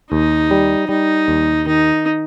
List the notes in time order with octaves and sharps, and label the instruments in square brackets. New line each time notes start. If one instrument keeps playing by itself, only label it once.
[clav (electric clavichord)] D#2 [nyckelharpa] D#4
[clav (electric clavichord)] G3
[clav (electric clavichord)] G3 [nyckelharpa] D#4
[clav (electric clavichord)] D#2
[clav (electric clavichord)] D#3 [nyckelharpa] D#4